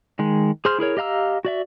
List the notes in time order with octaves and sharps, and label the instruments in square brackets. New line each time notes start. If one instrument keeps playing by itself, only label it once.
[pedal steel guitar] D#3 G#3
G#4 C5 C6 F6
E4 G#4 A#4 C#5
G4 D#5 F5 A#5 E6
F#4 D5 E5